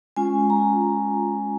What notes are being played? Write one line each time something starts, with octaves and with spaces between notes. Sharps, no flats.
G#3 C#4 F4 G#5
A#5